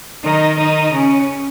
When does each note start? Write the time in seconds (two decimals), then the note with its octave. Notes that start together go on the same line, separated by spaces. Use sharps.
0.23 D#3 D#4
0.57 D#3 D#4
0.91 C#3 C#4